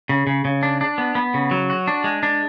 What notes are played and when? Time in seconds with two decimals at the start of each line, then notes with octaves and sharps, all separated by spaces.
0.09 C#3
0.27 C#3
0.45 C#3
0.63 D4
0.81 D4
0.98 B3
1.15 B3
1.34 C#3
1.51 F#3
1.70 F#4
1.88 D4
2.04 G#3
2.23 D4